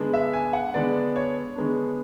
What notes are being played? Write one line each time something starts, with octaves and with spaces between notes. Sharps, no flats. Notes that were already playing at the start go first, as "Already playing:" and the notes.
Already playing: D3 G#3 B3 D4
E5
G#5
F#5
D3 G#3 B3 D4 D5
C#5
D3 G#3 B3 D4